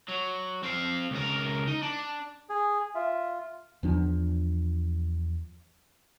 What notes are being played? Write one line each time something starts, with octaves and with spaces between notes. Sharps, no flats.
F#3
C4 F5
C#2 A#4
D#4
D4
G#4
F4 E5
E2 F3 D4